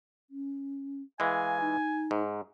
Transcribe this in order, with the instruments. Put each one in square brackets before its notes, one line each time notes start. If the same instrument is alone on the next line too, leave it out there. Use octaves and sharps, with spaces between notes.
[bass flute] C#4
[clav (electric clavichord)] E3 G#3 [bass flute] F5 [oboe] G#5
[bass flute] D#4
[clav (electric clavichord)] G#2